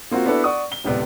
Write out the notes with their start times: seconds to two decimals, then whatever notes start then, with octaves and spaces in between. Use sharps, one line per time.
0.11 A#3 C4 F4 F#4
0.26 B3 D4 E4 F#4 A4 B4
0.44 D5 F#5 C#6 D#6
0.72 G7
0.84 D1 C#2 C3 B3 D5